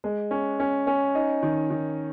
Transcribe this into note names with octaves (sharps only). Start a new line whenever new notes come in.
G#3
C#4
C#4
C#4
D#4
D#3
D#3